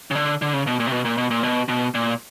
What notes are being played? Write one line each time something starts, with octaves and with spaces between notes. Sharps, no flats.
C#3
D3
D3
C#3
B2
A#2
C3
B2
A#2
B2
A#2
B2
B2
A#2